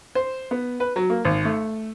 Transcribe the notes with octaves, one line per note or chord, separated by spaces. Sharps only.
C5
B3
B4
F#3
A#3
G#1
A3